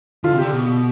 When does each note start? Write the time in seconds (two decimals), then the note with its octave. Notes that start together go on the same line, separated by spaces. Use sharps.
0.24 D3 F4
0.33 C3
0.38 D3 G4
0.53 B2